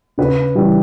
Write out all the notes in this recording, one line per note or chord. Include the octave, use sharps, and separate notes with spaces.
C#3 B4
E3 G3